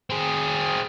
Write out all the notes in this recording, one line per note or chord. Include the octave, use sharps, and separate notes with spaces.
C4 G#4